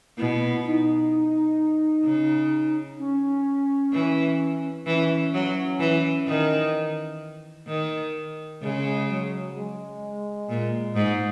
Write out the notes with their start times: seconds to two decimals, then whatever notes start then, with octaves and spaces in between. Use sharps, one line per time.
0.17 B2 E4
0.65 D#4
2.04 C#3
2.99 C#4
3.93 E3
4.86 E3 C#4
5.33 F#3
5.80 E3
6.27 D#3
7.67 D#3
8.61 C#3 G#3
9.08 F#3
9.55 G#3
10.49 A#2
10.95 G#2